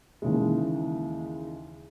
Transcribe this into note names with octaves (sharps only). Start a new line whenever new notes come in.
D#2 C#3 E3 G#3